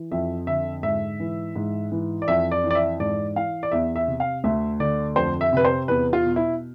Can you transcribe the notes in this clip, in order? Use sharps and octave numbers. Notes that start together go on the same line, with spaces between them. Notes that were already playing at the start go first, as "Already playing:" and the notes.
Already playing: E3
F2 E5
D3 E5
G#2 E5
E3
G#2
E3
D5
F2 E5
D5
E3
D5
E5
G#2 D5
E3 F5
D5
E2 E5
E5
C3
F5
D2 E5
D3 D5
F2 C5
E5
C3 B4
C5
E2 B4
F4
B2
E4